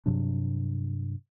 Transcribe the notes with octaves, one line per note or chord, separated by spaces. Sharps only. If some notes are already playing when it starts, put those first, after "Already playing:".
G2 C3 F#3 D4